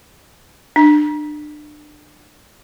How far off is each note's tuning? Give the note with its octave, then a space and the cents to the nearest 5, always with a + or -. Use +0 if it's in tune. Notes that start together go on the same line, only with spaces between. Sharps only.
D4 +30